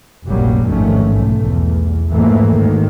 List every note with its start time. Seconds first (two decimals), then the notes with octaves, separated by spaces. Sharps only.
0.27 F1 A#1 F#2 F#3 G3 A#3
0.68 A1 F2 G#2 D#3 A3 C#4
1.11 B1 A3
1.43 E2
2.09 F2 G#2 E3 A3 A#3
2.53 G#1 D2 G#2 D#3